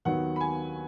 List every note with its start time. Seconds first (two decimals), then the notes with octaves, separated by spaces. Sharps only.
0.05 D#2 D#3 F#3 B3 F#5
0.36 B5
0.40 G#5